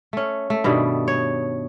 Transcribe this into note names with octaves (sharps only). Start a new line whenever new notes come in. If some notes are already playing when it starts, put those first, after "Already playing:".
A3 C#4
A3
G2 B2 D#3 G3
C#5